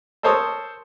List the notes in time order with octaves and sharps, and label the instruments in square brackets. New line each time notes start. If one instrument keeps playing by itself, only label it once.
[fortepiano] A4 A#4 C5 C#5 A5 D#6